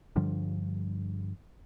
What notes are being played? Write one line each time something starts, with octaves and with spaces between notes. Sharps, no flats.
G2 D3 F3 G3